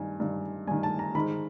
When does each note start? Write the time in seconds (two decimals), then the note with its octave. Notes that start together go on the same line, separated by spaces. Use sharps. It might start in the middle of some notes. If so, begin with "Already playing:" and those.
Already playing: G2 D#3 G#5
0.20 G2 D#3
0.67 G2 D#3 G#5
0.83 A5
0.99 A#5
1.15 G#2 D#3 B5